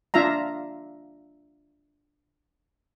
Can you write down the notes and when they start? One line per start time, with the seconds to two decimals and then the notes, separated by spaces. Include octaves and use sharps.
0.14 D4 F4 E5 F5 A#5